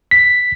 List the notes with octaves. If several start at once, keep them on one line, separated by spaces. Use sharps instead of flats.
B6